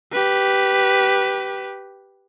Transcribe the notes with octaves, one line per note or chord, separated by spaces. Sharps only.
G4 B4